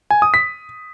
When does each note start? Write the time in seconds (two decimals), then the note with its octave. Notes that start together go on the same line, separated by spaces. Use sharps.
0.11 G#5
0.22 D#6
0.34 B6